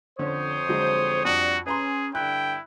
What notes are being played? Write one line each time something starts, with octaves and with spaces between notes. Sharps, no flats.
F2 D3 C#4 C5 C#5 D#6
D3 F#3 G#3
F2 G3 D4 F#4 D5
C#4 G#4 B4 A#5 C6
G2 D3 E4 G5 F#6